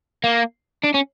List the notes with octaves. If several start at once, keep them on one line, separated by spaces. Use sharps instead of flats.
A#3
D4
C#4